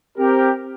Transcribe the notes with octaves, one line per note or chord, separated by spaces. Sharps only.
C4 G4 A#4